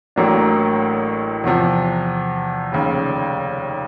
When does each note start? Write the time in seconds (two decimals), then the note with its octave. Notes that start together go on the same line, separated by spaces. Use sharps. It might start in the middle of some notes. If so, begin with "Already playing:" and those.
0.16 A1 A2 F#3 A#3 D4
1.44 E2 C3 F3
2.72 F1 D#2 C#3